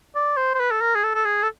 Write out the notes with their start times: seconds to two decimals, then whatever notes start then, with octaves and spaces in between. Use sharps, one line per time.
0.15 D5
0.37 C5
0.55 C5
0.60 B4
0.71 A4
0.81 A#4
0.95 G#4
1.04 A4
1.15 A4
1.25 G#4
1.43 A4